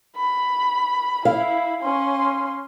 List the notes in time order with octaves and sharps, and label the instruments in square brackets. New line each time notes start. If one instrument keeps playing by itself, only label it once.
[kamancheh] B5
[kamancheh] E4 [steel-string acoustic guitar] F5
[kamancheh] C#4 C6